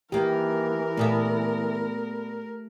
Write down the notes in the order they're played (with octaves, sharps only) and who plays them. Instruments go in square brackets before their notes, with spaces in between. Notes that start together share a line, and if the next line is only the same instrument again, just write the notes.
[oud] D#3 A#3 [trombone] E3 [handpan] G4 [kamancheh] A#4
[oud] A#2 B3 E5 [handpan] A3 A4